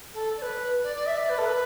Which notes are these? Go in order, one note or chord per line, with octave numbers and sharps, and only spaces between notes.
A4
D5
B4
D5
D5
E5
D5
B4
A4
B4